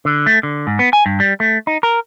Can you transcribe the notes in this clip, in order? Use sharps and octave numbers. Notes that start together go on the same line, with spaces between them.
D3
A3
D3
G#2
B3
G#5
G2
G3
A3
D#4
A#4